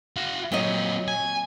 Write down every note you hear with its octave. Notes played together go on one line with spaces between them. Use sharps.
F#4 F5
A#2 F#3 C4 C#5 D#5
G#5